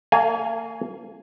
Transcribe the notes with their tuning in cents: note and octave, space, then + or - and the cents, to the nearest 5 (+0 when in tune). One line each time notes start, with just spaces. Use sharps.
A#3 -40 F5 +0 G#5 +0